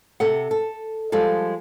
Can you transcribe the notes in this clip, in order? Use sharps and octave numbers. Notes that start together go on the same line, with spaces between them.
C3 A4 F#5
A4
F3 G3 G#3 A4